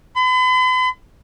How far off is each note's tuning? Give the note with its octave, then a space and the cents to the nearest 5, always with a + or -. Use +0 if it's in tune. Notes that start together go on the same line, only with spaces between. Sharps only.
B5 +45